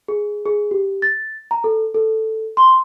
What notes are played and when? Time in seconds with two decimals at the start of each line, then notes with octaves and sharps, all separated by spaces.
0.08 G#4
0.46 G#4
0.71 G4
1.02 A6
1.51 A#5
1.64 A4
1.94 A4
2.57 C6